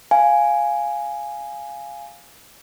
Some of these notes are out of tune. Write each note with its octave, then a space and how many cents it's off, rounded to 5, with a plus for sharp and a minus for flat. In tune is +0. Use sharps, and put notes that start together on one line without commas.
F5 +0 G#5 +0